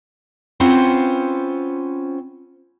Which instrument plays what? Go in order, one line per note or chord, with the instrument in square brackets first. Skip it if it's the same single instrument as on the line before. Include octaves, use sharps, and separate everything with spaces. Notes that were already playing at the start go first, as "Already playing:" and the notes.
[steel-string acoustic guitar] C4 C#4 F4 B4 C5 F#5